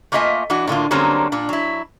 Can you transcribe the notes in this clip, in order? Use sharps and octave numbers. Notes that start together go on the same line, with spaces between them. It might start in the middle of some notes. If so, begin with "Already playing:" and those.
A3 A#3 F4 D#5 E5 G#5
E3 D4 F#4
A2 D3 A#3 F4
D3 F#3 G3 A#3 C4 C#4
A#2 D4
F#3 E4